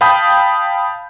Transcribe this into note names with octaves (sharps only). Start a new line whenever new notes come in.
F5 G5 A5 B5 D#6 G6